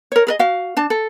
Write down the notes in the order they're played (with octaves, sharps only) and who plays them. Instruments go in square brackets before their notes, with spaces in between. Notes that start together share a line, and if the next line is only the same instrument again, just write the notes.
[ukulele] A#4 C#5
G#4 A#4 D#5
F#4 F5
D4 A5
A4